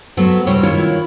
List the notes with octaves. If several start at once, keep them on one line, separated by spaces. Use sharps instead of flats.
F#3 A3 B3 C5
C3 G3 E4 C5 C#5
D#3 E4 F4 C#5